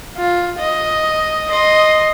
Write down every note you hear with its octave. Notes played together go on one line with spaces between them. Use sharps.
F4
D#5
D#5 C6